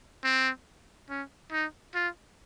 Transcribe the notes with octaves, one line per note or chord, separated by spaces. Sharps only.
C4
C#4
D#4
F4